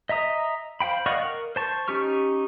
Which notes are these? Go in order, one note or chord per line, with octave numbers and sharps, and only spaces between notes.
D#5 E5 A#5 D#6
C5 F5 G5 B5
D5 D#5 F5 F#5 C#6
A#4
C5 A5 C#6
C#4 D#4 G4 C#6 F6